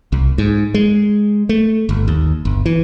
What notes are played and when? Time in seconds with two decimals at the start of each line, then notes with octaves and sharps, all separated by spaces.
0.12 C2
0.38 G#2
0.74 G#3
1.49 A3
1.89 G1
2.08 D#2
2.45 G1
2.66 E3